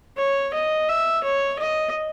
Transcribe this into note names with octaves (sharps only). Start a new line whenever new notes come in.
C#5
D#5
E5
C#5
D#5